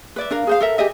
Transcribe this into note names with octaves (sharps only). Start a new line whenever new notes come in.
B4 D5 E5
D4 A#4 F5
G#4 C5 F5
A4 A#4 E5
G4 G#4 D#5 E5